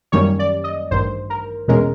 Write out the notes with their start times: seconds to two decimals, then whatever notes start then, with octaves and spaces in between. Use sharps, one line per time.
0.12 F#2 D#3 G3 A#3 C#4 C#5
0.39 D5
0.64 D#5
0.91 A1 G2 D#3 C5
1.30 A#4
1.68 E2 B2 G#3 C#4 A#4